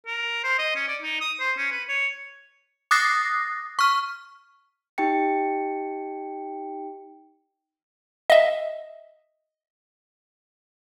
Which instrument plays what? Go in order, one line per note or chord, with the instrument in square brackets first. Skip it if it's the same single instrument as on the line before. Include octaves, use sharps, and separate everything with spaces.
[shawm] A#4
C5
D#5
C#4
D5
D#4
D#6
C5
C#4
B4
C#5
[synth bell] D6 D#6 F#6 A6 A#6 C7
C#6 F6
[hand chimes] D#4 G4 G5 C#7
[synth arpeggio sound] D#5 E5